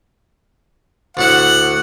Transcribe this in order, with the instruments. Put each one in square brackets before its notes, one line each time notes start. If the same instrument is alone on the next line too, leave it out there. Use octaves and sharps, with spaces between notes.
[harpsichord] D2 A2 E4 [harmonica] F#5